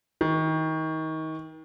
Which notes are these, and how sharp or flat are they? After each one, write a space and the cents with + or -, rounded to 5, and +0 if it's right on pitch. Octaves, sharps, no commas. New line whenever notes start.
D#3 +30